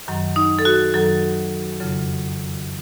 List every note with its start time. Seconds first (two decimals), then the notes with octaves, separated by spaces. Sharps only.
0.08 F#2 D#3 F#3
0.36 D#4
0.59 A4
0.65 F#4
0.94 F#2 D#3 F#3 A4
1.80 F2 C#3 F#3